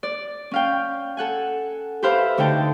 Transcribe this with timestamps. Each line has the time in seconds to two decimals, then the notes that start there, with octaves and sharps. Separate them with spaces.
0.03 D5
0.51 C#4 F5 G5
1.17 A4 F#5 G#5
2.03 G4 A4 B4 C5 E5 F5
2.38 D2 D3 D#4 G5 A5